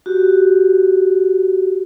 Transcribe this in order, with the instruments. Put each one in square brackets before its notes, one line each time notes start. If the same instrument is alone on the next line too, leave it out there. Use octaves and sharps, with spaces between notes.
[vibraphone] F#4 G4